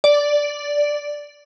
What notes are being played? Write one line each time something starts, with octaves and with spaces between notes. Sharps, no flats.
D5